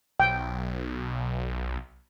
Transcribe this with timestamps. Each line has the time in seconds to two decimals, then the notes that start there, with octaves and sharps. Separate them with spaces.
0.20 B1 G5